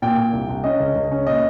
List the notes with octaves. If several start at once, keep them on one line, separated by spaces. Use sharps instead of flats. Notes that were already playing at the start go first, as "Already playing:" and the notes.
A#2 G5
A#2
C2
C2
C#4 D#5
C#2
C#2
C#4
A#2 D#5